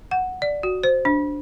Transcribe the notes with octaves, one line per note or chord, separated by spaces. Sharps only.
F#5
D5
F#4
C5
D4